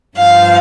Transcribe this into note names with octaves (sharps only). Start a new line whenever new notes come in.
G2 F3 F5